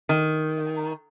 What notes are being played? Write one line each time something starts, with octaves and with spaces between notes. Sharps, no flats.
D#3